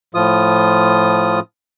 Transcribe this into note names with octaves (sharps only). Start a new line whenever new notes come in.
A2 F3 F4 D#6